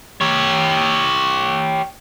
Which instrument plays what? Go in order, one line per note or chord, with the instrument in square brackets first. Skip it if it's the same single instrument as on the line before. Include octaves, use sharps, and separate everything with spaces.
[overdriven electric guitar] G4 C#5